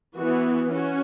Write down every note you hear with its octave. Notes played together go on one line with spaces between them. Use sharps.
E3 B3 F#4
C#4 F#4